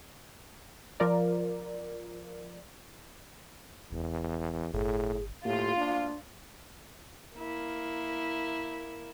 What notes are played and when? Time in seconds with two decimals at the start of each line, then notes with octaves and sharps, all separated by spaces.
1.00 F3 F4 A#4 D5
3.91 E1 E2
4.73 G1 A2 G#4
5.45 A2 A#3 F4 G4
5.77 D4 F5
7.38 A#3 E4